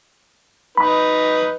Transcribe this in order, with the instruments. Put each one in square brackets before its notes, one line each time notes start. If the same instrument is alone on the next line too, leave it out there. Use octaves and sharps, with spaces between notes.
[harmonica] D#4 B4 [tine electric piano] B5